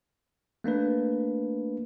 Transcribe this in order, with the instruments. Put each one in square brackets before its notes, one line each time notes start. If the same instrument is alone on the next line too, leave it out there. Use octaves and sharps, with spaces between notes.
[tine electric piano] A3 A#3 D4 B4